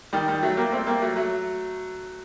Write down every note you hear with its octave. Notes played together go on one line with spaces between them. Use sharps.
D#3 G3
D#3 G3
F#3 A3
G3 A#3
A3 C4
G3 A#3
F#3 A3
F#3 A3